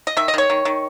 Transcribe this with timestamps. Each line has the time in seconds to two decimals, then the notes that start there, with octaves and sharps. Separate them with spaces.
0.07 D#5
0.17 D#3 E5
0.28 D#5
0.34 D#3 C#5
0.50 D#3
0.65 D#3